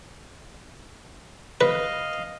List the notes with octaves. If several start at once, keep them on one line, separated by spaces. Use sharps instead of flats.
B4 D#5 F5